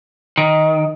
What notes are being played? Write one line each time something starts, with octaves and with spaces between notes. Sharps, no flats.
D#3